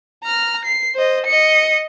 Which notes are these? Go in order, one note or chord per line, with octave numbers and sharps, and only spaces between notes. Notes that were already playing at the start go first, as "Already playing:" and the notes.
A#5 F6
C7
C5 D#5
D#5 C#7